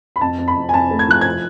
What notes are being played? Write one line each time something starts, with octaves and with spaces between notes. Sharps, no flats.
B5
F2 A5
F2
B5
F2
G#5
F2 A5
A3
G#6
F3 F#6
G#6